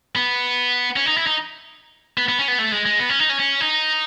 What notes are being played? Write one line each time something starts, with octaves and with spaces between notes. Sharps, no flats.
B3
C#4
D#4
E4
D#4
B3
B3
C#4
B3
A3
G#3
G#3
B3
C#4
D#4
C#4
C#4
D#4